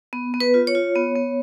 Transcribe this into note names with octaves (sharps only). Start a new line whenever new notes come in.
B3
B3
B4
F4
C#5
F4
B3
B3